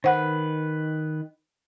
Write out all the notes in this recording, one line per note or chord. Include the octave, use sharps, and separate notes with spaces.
D#3 B4 C5 F#5